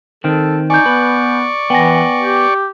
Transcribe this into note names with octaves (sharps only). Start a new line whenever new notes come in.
D#3 C4 A4
D#4 D5 G#5 C#6 G6
B3 B4
E3 B3 G5 G#5 A#6
G4